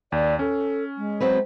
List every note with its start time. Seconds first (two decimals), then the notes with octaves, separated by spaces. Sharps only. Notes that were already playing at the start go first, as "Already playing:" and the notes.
0.12 D#2 D5
0.39 C#4 A4
0.97 G#3
1.20 F#3 C4 B4